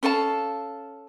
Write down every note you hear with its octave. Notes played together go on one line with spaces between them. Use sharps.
C#4 A4 F5 A5